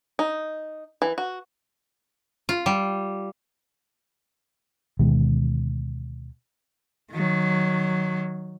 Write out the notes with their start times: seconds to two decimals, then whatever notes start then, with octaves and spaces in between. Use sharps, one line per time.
0.19 D#4
1.02 E3
1.18 F#4
2.49 F4
2.66 G3
4.99 D2 B2 D#3 G#3
7.12 D#3 F#3